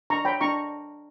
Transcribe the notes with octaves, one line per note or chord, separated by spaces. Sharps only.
D4 A#5 C#6
C#5 G5 B5
D4 A#5 C#6